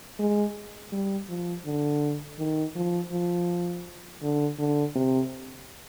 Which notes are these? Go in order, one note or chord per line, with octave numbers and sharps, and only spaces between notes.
G#3
G3
F3
D3
D#3
F3
F3
D3
D3
C3